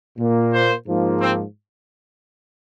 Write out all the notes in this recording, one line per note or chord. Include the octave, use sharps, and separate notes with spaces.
A#2 A#3
C5
G#2 F3 A#3
C4